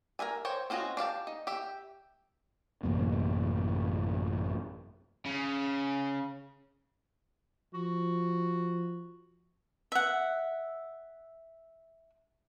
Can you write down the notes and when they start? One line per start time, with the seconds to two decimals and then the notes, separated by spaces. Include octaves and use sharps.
0.19 A#4 B4 E5 G#5
0.45 C5 C#5 G5
0.70 C4 C#4 F4 F#4 D#5
0.97 D4 G4 F5 A5
1.27 D#4
1.47 G4 E5
2.83 A1 F#2 C3 A#3
5.25 C#3
7.74 F3 F#4
9.92 E5 F#5